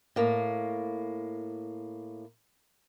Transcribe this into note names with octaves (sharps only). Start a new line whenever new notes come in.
A2 A#3